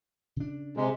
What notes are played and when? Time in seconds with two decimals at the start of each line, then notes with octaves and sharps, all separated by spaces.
0.36 C#3 D4
0.77 C3 G#3